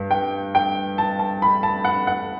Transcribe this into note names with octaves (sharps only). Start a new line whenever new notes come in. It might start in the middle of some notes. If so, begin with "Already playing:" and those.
Already playing: G2
G5
G5
A5
A5
B5
A5
F#5
F#5